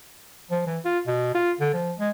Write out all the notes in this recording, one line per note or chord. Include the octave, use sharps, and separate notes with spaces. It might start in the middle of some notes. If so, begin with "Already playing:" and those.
F3
E3
F4
B2
F4
D3
F3
G#3